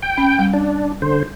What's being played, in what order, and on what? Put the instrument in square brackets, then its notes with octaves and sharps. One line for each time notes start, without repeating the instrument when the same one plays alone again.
[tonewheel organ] G5
[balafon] C#4
G3
[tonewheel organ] D4
D3 C5